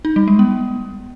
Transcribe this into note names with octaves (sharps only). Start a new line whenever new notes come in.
D#4
G3
G#3
B3